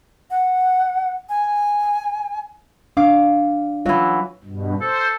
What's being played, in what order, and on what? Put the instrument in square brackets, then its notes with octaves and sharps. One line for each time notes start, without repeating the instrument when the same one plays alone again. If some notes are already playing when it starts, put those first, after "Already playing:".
[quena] F#5
G#5
[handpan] D4 [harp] F5 D6
[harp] E3 F#3 [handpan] F4 C#5 F5
[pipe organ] G2 B2
[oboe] A4 [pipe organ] C5